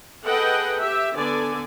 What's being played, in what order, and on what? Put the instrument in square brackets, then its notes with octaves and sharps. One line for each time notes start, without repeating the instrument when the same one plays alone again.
[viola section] G#4 A4 B4 D#5 F#5 G5
G4 E5
D3 B3 A4 D5 G#5